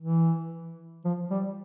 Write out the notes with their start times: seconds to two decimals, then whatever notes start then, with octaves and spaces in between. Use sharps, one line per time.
0.01 E3
1.05 F3
1.30 G3